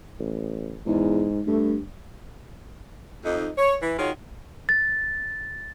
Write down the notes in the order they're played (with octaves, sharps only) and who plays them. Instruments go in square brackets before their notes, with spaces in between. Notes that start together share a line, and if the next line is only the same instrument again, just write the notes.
[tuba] A1
[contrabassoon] E2 [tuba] G#2
[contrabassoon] G2 [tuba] A3
[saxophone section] F2 D#4
C#5
E3
D#3 F4 F#4 G#4 C#5
[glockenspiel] A6